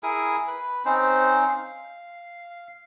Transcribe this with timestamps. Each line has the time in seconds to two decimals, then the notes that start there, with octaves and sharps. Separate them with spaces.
0.03 E4 G#4 A#4 G#5
0.47 B4
0.85 C4 C#4 D#4 C5
1.49 F5